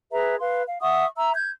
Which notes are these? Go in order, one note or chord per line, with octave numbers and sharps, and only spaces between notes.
G#4 B4 E5 A#5
B4 F5 C6
F5
E5 F#5 C#6 D#6
E5 A#5 E6
G6 G#6